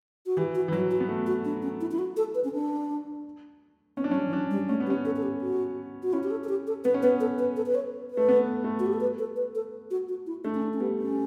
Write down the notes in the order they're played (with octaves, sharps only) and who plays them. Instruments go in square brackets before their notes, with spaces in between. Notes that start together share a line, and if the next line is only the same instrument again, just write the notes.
[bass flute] F#4
[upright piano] E3 [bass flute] G4
[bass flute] F#4
[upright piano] E3
[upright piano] F#3 [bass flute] E4
[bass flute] F#4
[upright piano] B3
A3
[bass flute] F#4
D4
C#4
E4
E4
F#4
A4
B4
C#4
D4
[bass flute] B3 [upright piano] C#4
[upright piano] D4
[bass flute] F#3 [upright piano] C#4
[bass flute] G3
E3
[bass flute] F#3 [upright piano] D4
[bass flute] G3
[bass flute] A3 [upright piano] C#4
[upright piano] B3
[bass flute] G4
[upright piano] C#4
[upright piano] C#4 [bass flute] A4
[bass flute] A4
G4
F#4
F#4
[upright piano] C#4 [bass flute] E4
[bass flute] G4
A4
A4
G4
A4
[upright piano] B3 [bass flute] B4
[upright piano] C#4
[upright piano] B3 [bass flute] B4
[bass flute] A4
B4
A4
B4
C#5
B4
[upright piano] A3
B3
A3
[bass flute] F#4
G4
A4
B4
A4
B4
A4
F#4
F#4
E4
[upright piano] A3 [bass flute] D4
[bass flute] C#4
D4
C#4
[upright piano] G3 [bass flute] B3
[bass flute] C#4